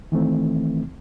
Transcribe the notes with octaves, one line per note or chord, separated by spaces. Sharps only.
D#3 E3 A3 C4